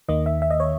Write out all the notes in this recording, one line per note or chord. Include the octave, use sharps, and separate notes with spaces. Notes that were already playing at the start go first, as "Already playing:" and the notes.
D#2 D#3 A#3 D#5
E5
E5
D#5
C#5